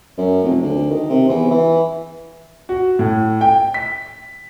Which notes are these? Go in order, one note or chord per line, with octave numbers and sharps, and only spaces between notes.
F#2
F1
D2
D#3
C3
E2
E3
F#4
A2
G5
B6